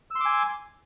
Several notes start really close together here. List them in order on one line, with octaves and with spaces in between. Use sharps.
E6 C6 D6 G#5